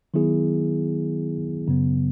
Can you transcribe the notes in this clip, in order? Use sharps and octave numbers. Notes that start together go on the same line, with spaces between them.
D#3 F#3 B3 E4 G#4
F#2 C#3 F#3 B3